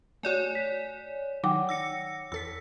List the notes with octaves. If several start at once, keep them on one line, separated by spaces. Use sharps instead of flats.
A3 F#4 C#5 D5 G#5
B6
D#3 F#3 D#4 F#5 G5 D6
E6 A#6 C#7
E2 A4 E6 B6